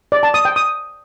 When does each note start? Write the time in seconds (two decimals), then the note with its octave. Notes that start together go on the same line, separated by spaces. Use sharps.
0.12 D5
0.23 A5
0.34 D#6
0.45 G5
0.56 D#6